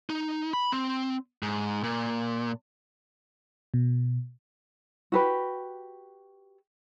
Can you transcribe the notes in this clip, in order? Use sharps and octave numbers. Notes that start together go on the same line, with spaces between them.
D#4
B5
C4
G#2
A#2
B2
F#4 G4 B4